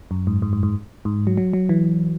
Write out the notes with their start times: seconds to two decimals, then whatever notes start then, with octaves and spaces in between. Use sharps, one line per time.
0.11 F#2
0.27 G#2
0.42 G#2
0.53 G#2
0.63 G#2
1.05 G#2
1.27 F#3
1.37 F#3
1.53 F#3
1.69 E3